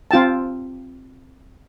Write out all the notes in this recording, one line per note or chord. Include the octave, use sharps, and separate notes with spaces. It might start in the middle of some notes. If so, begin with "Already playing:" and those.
C4 F4 G5 A5